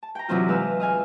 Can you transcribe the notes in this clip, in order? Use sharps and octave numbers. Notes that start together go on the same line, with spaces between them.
A5
G5 A#5
C3 E3 F#3 C4 D4 F4
G#3 B4 F5 E6
D#5 F5 G#5